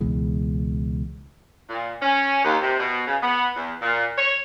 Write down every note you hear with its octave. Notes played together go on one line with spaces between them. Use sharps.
C#2 B2 E3 G#3
A#2
C#4
D#2
C3
B2
C#3
B3
E2
A#2
C#5